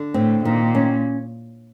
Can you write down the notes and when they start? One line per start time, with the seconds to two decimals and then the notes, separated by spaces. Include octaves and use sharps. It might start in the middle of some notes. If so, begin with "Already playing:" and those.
Already playing: D3
0.14 A2 C4
0.45 A#2 D#3
0.75 C#4